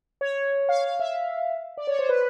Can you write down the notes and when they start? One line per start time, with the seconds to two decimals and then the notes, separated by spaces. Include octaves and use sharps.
0.21 C#5
0.69 F5
0.84 F5
0.99 E5
1.77 D5
1.87 C#5
1.99 C5
2.09 B4